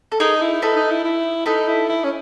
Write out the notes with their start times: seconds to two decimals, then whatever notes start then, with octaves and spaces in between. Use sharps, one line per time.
0.12 A4
0.20 D#4 G#4 A#4
0.41 E4
0.62 D#4 A4 B4
0.76 D#4
0.91 E4
1.04 E4
1.46 D#4 A4 B4
1.68 E4
1.89 E4
2.04 C#4